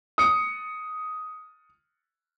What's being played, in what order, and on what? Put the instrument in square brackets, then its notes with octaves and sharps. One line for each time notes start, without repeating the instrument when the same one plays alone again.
[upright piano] D#6 C#7